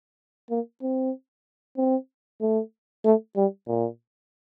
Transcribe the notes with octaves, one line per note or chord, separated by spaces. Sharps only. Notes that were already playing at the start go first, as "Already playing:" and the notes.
A#3
C4
C4
A3
A3
G3
A#2